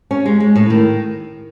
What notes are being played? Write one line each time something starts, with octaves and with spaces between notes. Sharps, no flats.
C#4
G#3
G#3
A2
D#3